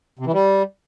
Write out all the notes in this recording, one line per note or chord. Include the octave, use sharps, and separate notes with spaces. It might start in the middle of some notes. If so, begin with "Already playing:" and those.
C3
E3
G3